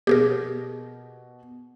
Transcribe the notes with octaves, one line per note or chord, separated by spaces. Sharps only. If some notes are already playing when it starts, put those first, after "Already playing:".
B2 G4 G#4 A#4